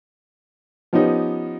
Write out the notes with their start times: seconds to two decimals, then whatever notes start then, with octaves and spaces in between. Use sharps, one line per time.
0.93 F3 B3 C#4 D#4 G4